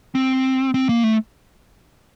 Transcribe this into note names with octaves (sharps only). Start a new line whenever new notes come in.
C4
C4
A#3
A3